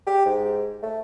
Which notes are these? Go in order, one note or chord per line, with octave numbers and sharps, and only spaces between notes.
G4
G#2
A3